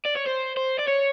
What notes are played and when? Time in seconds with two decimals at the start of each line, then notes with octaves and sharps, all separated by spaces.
0.06 D5
0.17 C#5
0.27 C5
0.57 C5
0.78 D5
0.87 C#5